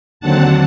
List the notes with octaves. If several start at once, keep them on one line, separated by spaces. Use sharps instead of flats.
D#2 D3 F#3 C4 F#5 A5